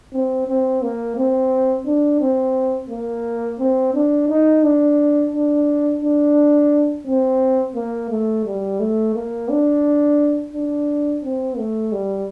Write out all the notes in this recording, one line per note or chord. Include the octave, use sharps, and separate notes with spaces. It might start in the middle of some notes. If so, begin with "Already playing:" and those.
C4
C4
A#3
C4
D4
C4
A#3
C4
D4
D#4
D4
D4
D4
C4
A#3
A3
G3
A3
A#3
D4
D4
C4
A3
G3